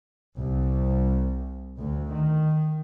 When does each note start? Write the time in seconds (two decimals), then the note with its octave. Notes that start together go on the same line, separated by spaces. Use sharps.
0.38 C2
1.78 D2
2.14 D#3